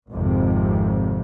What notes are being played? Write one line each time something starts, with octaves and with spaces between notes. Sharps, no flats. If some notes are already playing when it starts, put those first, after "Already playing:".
G#1 F2 C3